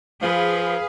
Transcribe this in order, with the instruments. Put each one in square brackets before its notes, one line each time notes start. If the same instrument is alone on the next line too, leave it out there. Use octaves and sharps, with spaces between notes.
[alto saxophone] F3 [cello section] G#4 B4 [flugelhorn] F5